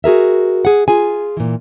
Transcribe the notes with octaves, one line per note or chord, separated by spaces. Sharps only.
F#4 G#4 A#4 E5
G#4 F#5
F4 G#4 G#5
A#2 E3